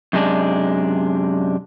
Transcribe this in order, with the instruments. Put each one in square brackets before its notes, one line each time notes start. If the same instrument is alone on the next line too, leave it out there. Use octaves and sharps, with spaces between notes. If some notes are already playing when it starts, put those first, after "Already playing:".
[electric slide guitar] F#2 C3 G#3 D4